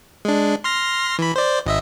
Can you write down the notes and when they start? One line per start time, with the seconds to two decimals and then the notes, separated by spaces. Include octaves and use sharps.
0.25 G#3 D4
0.64 C6 F6 A#6
1.19 E3 B5
1.36 C5 D5
1.66 G#1 D#5 E5